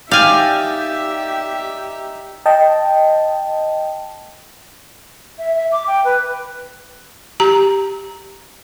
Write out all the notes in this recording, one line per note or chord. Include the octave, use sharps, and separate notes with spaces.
D#4 G4 D5 E5 F5 G5 G#5
D#5 G5 A5
E5
E5
D6
G5
B4
G4 A#5